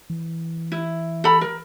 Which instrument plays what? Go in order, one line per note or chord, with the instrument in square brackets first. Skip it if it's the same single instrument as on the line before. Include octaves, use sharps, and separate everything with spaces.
[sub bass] E3
[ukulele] E4
A4 B5
A#4